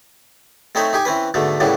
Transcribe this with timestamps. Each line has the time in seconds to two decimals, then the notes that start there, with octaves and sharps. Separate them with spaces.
0.75 A3 C4 D#4 C#5 D#5 E5
0.93 D#4 G4 G#5
1.05 E3 C4 C#4 B4
1.34 G#2 B2 D3 A3
1.60 F#2 A2 C#3 E3 F#3 G3